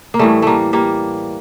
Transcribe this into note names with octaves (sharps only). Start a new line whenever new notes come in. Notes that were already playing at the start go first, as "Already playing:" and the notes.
A#3
A2 E3 G3 A3
G3 A3 A#3
G3 A#3